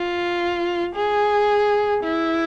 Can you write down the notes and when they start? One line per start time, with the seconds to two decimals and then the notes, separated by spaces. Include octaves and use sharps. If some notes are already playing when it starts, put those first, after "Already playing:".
Already playing: F4
0.95 G#4
2.04 E4